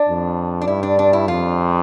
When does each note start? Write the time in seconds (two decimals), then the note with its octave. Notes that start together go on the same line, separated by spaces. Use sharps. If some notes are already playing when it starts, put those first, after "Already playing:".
Already playing: D4
0.08 F2
0.61 D4
0.68 G2 E4
0.83 D4
0.99 D4
1.13 E4
1.28 F2 F4